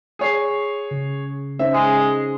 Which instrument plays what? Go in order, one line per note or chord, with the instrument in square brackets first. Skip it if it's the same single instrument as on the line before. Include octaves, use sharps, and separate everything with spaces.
[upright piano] G#4 C#5 C7
[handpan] C#3
[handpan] C#4 D#4 C5 [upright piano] E5
[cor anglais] G#3 [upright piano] G#4
[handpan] D#5